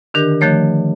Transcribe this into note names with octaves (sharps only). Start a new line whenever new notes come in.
D3 D#3 D4 G4 A#4
D3 D#3 F3 A3 C#5